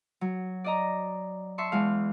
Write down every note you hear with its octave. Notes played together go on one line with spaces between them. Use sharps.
F#3
D5 D#5 A#5
E5 A5 C6 C#6
E2 G#3 F5